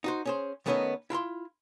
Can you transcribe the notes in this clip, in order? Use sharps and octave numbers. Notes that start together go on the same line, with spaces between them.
D#4 F#4 C5
C#4 G#4 C5
D#3 A3 B3 C#4 D#4 D#5
E4 F4 A#5 C6